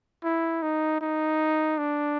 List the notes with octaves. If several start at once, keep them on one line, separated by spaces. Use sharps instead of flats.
E4
D#4
D#4
D4